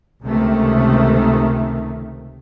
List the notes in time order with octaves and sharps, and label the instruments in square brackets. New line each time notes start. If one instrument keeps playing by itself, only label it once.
[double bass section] C#2 C3 D#3 A3